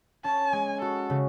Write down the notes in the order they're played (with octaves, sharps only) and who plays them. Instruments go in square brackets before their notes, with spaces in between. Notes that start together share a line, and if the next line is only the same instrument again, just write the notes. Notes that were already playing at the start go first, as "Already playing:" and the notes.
[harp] C#4 [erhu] A5
[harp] G#3 [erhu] G#5
[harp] F#4 [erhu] A4
[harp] C#3